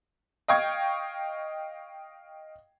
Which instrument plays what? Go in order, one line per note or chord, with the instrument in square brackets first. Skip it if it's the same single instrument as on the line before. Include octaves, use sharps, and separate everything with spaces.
[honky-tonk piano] D#5 F5 G5 C#6 G#6